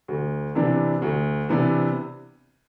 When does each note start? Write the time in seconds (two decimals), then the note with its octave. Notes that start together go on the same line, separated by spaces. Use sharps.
0.08 D2
0.55 C3 E3 B3 D4
1.02 D2
1.49 C3 E3 B3 D4